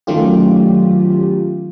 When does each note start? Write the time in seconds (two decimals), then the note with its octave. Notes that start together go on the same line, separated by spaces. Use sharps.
0.07 D#3 F#3 A3 C#4 F4 G4